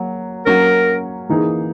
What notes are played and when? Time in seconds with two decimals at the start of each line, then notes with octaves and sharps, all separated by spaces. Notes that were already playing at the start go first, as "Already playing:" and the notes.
Already playing: F#3 A#3
0.46 F#3 A#3 C#4 A#4
1.30 E3 A#3 D#4 G#4